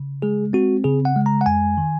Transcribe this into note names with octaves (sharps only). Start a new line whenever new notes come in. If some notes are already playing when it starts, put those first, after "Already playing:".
Already playing: C#3
G#3 G#4
C4 F#4
C#3 G#4
F#5
G#3
A#5
F#5
F2 G#5
D#3